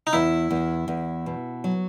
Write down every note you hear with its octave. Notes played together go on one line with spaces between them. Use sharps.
D#4
E2 E4
E2
E2
B2
F#3